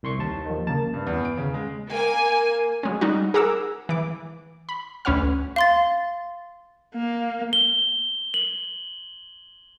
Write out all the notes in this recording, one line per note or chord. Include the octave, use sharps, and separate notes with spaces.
C2 C6 C#6
D#2 A5
D#3 F3
C#3 A#3 A5
G2
E2
D7
C#3
G#3
A#3 G#5
F#3 G#3 C#4
G3 D#4 F#4
G#4 A#4 F#5 A#5 D6 E6
E3 D6
B5
D2 C#4 B4 C#5 F#5 F6
F5 C6 A6
A#3
G7
F#7